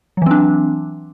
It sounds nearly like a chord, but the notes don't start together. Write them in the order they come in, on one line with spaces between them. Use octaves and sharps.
F#3 E3 C4 D4